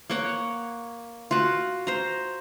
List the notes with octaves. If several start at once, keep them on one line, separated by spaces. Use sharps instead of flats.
A#3 C#5 F#5
F4 F#4
C5 A#5